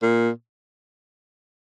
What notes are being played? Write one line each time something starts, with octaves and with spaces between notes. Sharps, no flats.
A#2